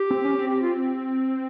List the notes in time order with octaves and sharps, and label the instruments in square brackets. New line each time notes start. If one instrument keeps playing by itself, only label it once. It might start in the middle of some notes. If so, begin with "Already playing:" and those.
Already playing: [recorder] G4
[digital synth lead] C4
C#4
C4
[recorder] G4
F4